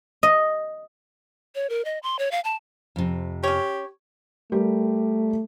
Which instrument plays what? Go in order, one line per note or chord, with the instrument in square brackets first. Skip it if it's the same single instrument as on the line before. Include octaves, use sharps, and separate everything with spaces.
[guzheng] D#5
[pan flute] C#5
A#4
D#5
C6
C#5
F5
A5
[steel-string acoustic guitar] F2 C3
[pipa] C#4 C#5 [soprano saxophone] G4
[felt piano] G3 G4 A#4 [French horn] A3